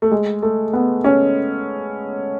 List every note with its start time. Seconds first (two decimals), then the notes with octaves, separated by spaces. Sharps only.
0.02 A3
0.11 G#3
0.42 A3
0.73 B3
1.04 C#4